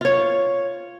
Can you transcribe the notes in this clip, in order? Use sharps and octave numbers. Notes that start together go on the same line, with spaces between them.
F4 C#5